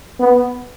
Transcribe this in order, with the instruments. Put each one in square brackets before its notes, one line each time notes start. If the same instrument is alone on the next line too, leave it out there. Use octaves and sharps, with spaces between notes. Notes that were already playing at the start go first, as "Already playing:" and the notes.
[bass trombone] B3